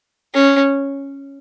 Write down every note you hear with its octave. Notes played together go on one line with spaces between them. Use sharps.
C#4